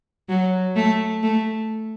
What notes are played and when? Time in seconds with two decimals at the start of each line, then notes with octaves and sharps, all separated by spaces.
0.29 F#3
0.76 A3
1.23 A3